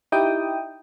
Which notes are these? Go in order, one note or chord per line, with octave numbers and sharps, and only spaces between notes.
D#4 E4 G4 G5 D#6